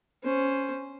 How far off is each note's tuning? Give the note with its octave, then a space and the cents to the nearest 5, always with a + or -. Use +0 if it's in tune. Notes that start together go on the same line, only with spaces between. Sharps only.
C#4 +0 C5 +0